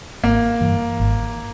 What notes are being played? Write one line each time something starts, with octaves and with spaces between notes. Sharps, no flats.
G#1 A#3
G2 E3
G#1